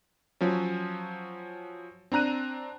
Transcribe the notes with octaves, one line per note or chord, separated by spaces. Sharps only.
F3 F#3 C#4
C4 D4 A#5 F#6 D#7